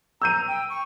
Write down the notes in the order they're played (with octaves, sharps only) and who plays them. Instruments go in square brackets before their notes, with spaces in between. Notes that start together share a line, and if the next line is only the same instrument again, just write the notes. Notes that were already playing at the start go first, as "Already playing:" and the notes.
[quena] A#5 [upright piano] E6 G6 D#7
[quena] G5
C#6